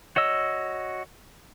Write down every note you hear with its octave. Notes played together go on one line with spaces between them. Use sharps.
F#4 C#5 D#5 E6